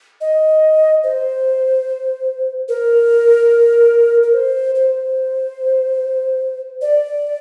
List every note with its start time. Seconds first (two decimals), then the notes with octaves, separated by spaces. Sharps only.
0.21 D#5
1.03 C5
2.69 A#4
4.23 A#4
4.34 C5
4.75 C5
6.81 D5